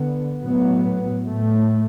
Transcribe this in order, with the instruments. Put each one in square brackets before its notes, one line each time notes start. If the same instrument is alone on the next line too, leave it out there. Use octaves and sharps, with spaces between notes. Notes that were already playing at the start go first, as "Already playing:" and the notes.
Already playing: [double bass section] D3 B3
A2 F#3 B3
A2 A3